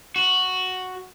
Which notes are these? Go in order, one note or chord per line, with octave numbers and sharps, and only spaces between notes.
F#4